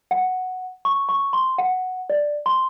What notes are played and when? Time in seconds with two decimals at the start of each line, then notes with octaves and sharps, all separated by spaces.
0.11 F#5
0.85 C#6
1.09 C#6
1.33 C6
1.58 F#5
2.10 D5
2.46 C6